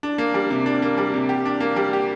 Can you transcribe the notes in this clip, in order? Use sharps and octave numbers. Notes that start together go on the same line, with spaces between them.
D4
A#3
G3
C3
D4
A#3
G3
C3
G4
D4
A#3
G3
G4